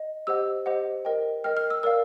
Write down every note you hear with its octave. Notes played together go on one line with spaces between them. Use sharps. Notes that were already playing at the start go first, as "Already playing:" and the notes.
Already playing: D#5
G4 C5 D#5 F#5 E6
G4 C5 D#5 F#5
A#4 D#5 G5
A#4 D#5 G5 F6
F6
E6
A#4 D5 F5 E6